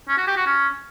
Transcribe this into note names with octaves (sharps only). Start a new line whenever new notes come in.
C#4
F#4
G4
F#4
C#4